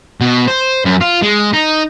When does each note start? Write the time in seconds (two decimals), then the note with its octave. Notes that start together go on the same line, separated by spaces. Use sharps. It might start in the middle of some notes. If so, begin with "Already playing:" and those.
0.21 B2
0.48 C5
0.85 F#2
1.01 F4
1.22 G#3
1.53 D#4